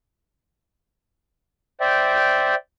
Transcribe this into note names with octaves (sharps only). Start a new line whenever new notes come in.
C5 D5 E5 G5